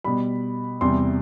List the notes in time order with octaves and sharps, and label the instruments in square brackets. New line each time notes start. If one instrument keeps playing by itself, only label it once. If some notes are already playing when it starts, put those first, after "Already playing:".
[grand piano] B2 G3 B5
E2 C3 G3 C6